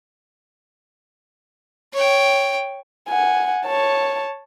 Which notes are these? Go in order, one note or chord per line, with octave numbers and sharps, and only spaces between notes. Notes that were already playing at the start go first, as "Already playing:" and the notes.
C#5 G5
F#5 G#5
C#5 A5